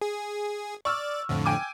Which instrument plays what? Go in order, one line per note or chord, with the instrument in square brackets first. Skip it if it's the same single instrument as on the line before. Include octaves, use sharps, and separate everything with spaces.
[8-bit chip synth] G#4
[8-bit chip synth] D5 [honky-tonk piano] C#6 E6 F6
[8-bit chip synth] F2 A2 D3
[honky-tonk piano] G5 G#5 D6